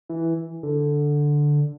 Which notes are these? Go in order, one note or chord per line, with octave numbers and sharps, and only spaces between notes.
E3
D3